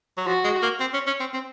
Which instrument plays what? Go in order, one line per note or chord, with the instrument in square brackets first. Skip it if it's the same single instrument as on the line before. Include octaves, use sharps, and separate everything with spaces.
[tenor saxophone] F#3
[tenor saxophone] F3 [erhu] F#4
[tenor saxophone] G#3
A#3
C4
C#4
C#4
C4
C4